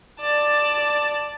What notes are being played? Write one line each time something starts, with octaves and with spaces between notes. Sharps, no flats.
D5 A5